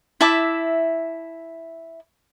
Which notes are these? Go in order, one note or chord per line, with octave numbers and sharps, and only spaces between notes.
E4 E5 A5 D6